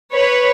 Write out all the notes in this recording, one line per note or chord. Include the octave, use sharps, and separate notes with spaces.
B4 C#5